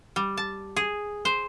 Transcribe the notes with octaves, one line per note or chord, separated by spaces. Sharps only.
G3
A5
G#4
C5